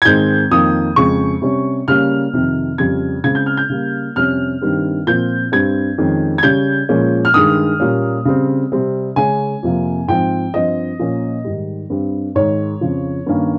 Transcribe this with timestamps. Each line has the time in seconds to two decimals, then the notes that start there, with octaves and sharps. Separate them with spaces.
0.02 G#6
0.05 G#2 D#3 G#3 C4 G6
0.51 F2 D#3 A#3 D#6
0.96 F2 C#3 G#3 C#6
1.42 C3 G3 C#4
1.88 C#3 G3 A#3 C#4 F6
2.33 F2 C3 D#3
2.78 F2 C#3 G3 G#6
3.24 C#3 G#3 C4 G#6
3.35 G6
3.46 F6
3.57 G6
3.70 C#3 G3 A#3
4.15 F2 C3 G3 C#4 F6
4.61 G2 D#3 G3 C4
5.07 A#2 F3 C4 G6
5.52 G2 G3 C4 G#6
5.98 F2 D#3 G#3 C#4
6.38 G#6
6.43 C#3 G3 C#4 G6
6.89 A#2 F3 G#3 C#4
7.25 F6
7.34 G2 D#3 G#3 D#6
7.80 A#2 G3 A#3 C#4
8.25 C#3 G3 C4
8.72 C3 G3 C4
9.16 C#3 G#3 C#4 G#5
9.63 F2 C3 F3 A#3
10.08 G#2 F3 C4 G5
10.54 G2 F3 C4 D#5
10.99 A#2 F3 A#3 C#4
11.44 G#2 D#3 G3
11.90 G2 G3 C4
12.35 G#2 D#3 G#3 C#5
12.81 F2 C#3 F3
13.26 G2 D#3 A#3 C#4